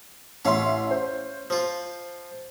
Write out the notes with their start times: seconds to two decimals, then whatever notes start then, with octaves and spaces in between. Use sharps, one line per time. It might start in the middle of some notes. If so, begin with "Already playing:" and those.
0.45 A1 C#4 E5 F5 C6
0.91 C5
1.50 F3 F4